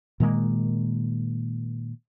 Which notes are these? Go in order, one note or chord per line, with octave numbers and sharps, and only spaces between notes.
A#2 D#3 G#3 A#3